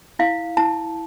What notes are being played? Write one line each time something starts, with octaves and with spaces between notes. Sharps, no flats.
E4 F5
E4 A5